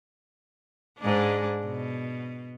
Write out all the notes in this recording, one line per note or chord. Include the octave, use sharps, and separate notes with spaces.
G#2 G#3 D4
B2